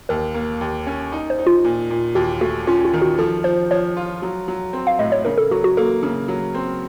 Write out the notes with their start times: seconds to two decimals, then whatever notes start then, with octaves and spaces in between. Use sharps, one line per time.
0.09 D#2 A#4
0.34 A#3
0.61 D#2
0.86 C#4
1.12 D#4
1.30 C5
1.39 D#4
1.47 F4
1.64 A#2
1.90 A#2
2.15 D#2 F#4
2.41 A3 F#4
2.67 C#4 F4
2.85 F4
2.94 D#3
3.02 F#4
3.18 F3 A4
3.44 F3 C5
3.71 F3 C#5
3.96 F4
4.22 F#3
4.48 F#3
4.73 C4
4.87 F5
4.99 A2 D#5
5.12 C#5
5.25 C#3 A#4
5.38 A4
5.51 F#3 F#4
5.64 F#4
5.77 A#3 A4
6.03 C#3
6.28 F#3
6.54 C4